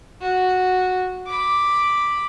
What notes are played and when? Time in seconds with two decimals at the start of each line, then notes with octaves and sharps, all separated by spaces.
0.21 F#4
1.28 B5 D6